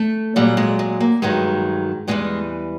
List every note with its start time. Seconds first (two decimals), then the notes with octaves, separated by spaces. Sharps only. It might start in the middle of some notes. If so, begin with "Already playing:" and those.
Already playing: A3
0.36 A#2 F#3 G3
0.57 G#3
0.79 G#3
1.00 A#3
1.22 G2 D#3 F#3 G#3
2.08 E2 C#3 E3 G3 G#3